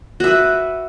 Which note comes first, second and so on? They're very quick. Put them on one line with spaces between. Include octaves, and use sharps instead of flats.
F#4 E5 B4